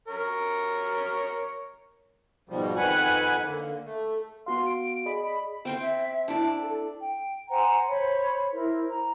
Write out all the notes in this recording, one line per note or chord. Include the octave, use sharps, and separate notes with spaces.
A#4 C#5
G#2 B2 F3 G3
F2 D#3 B4 F#5 G#5 F#6
D3 A#3
A3
B3 F#4 F5 C6
D7
G#4 D5 D#5 B5
B5
C4 G5 C6
E5
D4 E4 D5 A5
A4
G5
C5 F#5 G#5 A#5
C5 C#5 B5
E4 A#4 C5
A#5